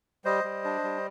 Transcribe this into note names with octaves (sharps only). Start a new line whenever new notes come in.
G3 C5 D#5
G3
D4
G3